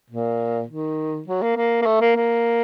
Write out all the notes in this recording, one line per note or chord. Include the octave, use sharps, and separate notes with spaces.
A#2
D#3
F#3
A#3
A#3
A#3
A3
A#3
A#3